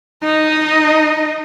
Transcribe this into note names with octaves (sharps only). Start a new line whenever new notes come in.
D#4 D#5